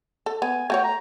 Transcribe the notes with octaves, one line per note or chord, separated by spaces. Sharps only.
A4
B3 G#5
A3 F#4 C#5 G5
A#5